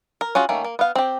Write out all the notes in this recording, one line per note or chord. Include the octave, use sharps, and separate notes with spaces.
A#4
C#4 F4 F#4 G#4
D#3 A3 A#3 C#4
A#3
B3 F5
C4 G4